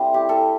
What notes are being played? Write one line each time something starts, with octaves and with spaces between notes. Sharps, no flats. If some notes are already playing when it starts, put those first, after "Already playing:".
Already playing: G3 A3 C4 D4 E4
G4
A4